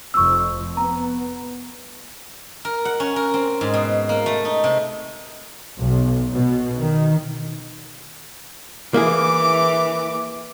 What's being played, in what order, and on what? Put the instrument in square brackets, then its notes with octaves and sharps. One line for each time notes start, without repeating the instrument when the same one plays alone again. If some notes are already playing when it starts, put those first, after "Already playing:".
[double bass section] F1 F2 F3 [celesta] C#6 E6
[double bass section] B3 [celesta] A#5
[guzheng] A#4
F#5
C#4
A#4
C4
G#2
B2
A#3
A3
D#4
C3
[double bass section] B1
B2
D#3
[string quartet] E3 D6 [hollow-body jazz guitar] A#3 E4 G#4